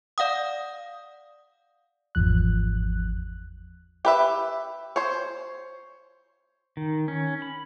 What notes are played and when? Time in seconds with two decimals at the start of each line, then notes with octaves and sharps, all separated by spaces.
0.18 D5 F5 F#5 D#6
2.15 G#1 E2 F3 F#6
4.05 G4 B4 E5
4.96 C5 C#5
6.77 D#3
7.08 C#4
7.42 B5